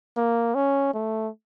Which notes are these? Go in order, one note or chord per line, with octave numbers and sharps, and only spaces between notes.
A#3
C#4
A3